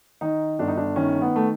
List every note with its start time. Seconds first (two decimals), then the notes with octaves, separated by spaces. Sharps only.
0.21 D#3 D#4
0.59 G1 D4
0.68 D#4
0.77 D4
0.96 D#3 C#4
1.22 B3
1.36 A3